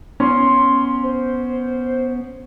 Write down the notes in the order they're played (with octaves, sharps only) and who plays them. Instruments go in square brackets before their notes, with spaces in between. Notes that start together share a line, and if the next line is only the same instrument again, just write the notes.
[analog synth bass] B3 [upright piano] C#4 [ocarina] C6
[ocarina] C5